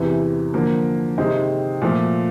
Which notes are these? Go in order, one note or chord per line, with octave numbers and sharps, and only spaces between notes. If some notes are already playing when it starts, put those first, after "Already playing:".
Already playing: E2 C3 E3
D3 F3 A#3
C3 D#3 G#3 C4
A#2 F3 A3